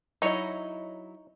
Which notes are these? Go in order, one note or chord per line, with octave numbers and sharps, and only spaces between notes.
F#3 D#4 E4 C#5 D#5